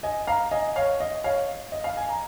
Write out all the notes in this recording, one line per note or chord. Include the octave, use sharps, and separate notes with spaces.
D#5 G#5
F5 A#5
D#5 G#5
C#5 F5
D#5
C#5 F5
D#5
F5
G#5
A#5